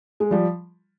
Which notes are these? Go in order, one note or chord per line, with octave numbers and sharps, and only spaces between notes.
G#3
F3 G3